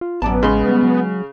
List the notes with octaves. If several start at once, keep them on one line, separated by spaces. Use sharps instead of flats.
F4
A1 F#2 B3 D5 A5
C#3 G#3 B5 C6
G3
F#3